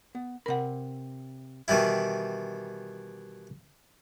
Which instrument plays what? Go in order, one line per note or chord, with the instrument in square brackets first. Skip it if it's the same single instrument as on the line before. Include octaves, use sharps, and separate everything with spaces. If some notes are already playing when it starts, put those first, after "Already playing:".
[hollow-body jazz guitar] B3
[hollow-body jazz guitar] C3 B5 [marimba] A#4 F#5
[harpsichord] B2 D#3 E3 G3 E4